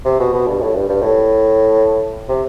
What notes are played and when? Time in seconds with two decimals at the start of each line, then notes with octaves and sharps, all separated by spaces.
0.05 C3
0.20 B2
0.33 B2
0.47 G2
0.62 A2
0.75 G2
0.89 G2
1.03 A2
2.29 C3